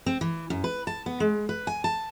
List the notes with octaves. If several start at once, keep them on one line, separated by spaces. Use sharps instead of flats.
C4
E3
F#2
B4
A5
B3
G#3
B4
G#5
A5